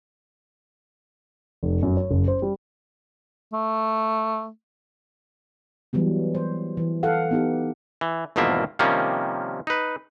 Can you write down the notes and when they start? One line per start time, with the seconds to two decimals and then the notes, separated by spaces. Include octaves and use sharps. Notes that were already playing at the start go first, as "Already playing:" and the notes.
1.63 F1
1.83 F#2
1.97 C#5
2.11 F#1
2.28 C5
2.42 G3
3.53 A3
5.93 E3 F#3 G3 B3
6.35 C5
6.77 E3
7.03 A4 F5 F#5
7.31 B3 D#4 G4
8.01 E3
8.36 G#1 E2 B2 F3 A#3 E5
8.79 C3 D#3 F3 G3 A#3 C#4
9.67 D#4 B4